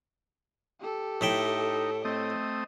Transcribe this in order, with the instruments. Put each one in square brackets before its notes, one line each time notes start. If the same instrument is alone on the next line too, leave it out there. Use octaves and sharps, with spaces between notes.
[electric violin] G4 A4
[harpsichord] A2 E5 G5 [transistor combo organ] D#4
[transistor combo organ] A3 C4 D#6 [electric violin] D#5